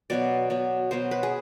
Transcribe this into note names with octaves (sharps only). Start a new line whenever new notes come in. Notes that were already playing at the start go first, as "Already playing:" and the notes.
B2 F#3 B3 D5
B2 F#3 B3
B2 F#3 B3 C5
B4
G#4